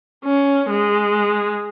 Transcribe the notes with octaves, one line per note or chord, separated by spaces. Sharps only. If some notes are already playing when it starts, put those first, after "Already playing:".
C#4
G#3